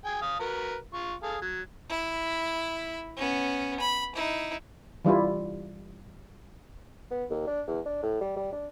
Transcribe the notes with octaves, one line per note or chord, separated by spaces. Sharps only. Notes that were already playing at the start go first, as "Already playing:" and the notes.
G#4 G5 G#5
F5 D#6
F#4 A#4 B4
F4 C#6
G#4 A4 F5
F#3
E4 B5
B3 C#4
B5
D#4 E4
E3 G3 E4 F4
B3
D#2
D4
E2
D4
A2
G3
G3
D4